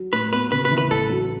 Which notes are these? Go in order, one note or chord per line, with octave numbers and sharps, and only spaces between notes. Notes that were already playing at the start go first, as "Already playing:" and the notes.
Already playing: F#3
A2 B4
B3 B4
C#3 B4
B4
E3
B4
A1 A4
F#3